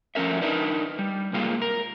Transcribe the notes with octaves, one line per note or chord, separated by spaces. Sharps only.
F3 A3 C#4 A#4 E5
D4 D#4 A#4 B4 D5
G3
C3 G3 G#3 A#3 F4
A#4